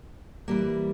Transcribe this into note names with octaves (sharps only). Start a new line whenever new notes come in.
E3 G3 A#3